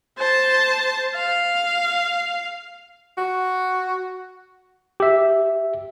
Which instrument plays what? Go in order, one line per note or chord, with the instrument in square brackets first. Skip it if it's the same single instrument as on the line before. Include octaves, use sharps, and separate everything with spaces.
[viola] C5 A5
F5
[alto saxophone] F#4
[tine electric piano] G4 E5